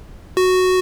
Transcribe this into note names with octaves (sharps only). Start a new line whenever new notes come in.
F#4